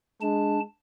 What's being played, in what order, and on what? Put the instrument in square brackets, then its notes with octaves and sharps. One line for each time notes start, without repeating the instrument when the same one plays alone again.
[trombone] G#3 [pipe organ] D4 A5